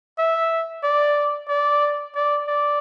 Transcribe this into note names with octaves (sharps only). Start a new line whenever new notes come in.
E5
D5
D5
D5
D5